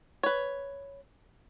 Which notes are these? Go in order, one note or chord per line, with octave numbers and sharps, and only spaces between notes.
B4 C#5